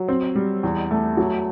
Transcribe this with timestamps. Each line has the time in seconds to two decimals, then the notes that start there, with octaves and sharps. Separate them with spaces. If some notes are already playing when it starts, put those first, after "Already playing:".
Already playing: F#3
0.08 C4
0.35 G3
0.63 E2
0.91 A3
1.17 F#3